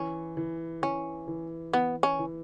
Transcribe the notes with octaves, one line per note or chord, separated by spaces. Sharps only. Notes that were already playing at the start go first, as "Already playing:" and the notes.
Already playing: E3 C#4
E3
E3 C#4
E3
E3 B3
C#4
E3